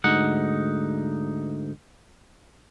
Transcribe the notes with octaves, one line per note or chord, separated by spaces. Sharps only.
D2 G#2 D#4 F#5